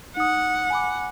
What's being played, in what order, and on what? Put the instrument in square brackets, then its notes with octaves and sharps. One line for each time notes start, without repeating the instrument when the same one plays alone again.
[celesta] D#4 D#6 [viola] F#5
[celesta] G#5 B5 D6